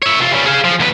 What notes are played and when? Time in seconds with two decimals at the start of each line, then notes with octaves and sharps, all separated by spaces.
0.02 C#5 E5
0.20 C3 F4
0.33 G3 C#4
0.46 G#4 F5
0.64 F3
0.80 D2 B4